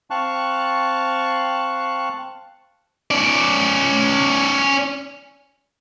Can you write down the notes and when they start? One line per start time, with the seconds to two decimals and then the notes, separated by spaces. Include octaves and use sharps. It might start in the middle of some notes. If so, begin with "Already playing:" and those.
0.10 C4 F5 A5 C#6 F#6
3.11 C#4 D5